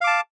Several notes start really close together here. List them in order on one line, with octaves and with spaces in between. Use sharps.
F5 D6 A5